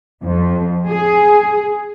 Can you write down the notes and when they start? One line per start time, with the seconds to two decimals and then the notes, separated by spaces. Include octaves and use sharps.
0.25 F2
0.89 G#4